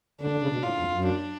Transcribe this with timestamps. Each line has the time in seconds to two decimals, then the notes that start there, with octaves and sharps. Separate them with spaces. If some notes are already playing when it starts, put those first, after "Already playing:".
0.21 D3 D4
0.31 D3
0.42 C#3
0.52 B2
0.63 A2 F4
0.79 F2
0.93 F#2
1.06 D4